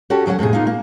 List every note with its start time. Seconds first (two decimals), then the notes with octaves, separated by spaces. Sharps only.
0.10 C#4 F#4 G4 A4
0.26 D2 F#3 G#3 C#4 F#5
0.39 F2 A2 C3 G#4
0.53 A#3 B3 D#4 F4
0.67 A#3